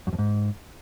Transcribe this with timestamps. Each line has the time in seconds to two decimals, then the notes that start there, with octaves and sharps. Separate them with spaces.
0.07 F#2
0.13 F2
0.19 G#2